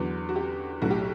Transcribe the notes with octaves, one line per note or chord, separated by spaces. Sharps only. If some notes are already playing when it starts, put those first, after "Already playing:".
Already playing: E2 D3 F#3 B3
F#4
G4
B1 A2 F#3 F#4
G4